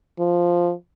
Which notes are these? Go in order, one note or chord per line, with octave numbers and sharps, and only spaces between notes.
F3